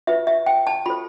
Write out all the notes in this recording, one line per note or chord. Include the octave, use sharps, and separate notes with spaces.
F4 B4 E5
E5
G5
A5
F4 A4 C5 B5